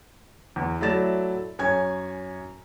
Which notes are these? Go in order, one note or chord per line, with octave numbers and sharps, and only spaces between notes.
E2
F#3 A3 E4 D5 A6 E7
F#2 C#5 G#5 G#6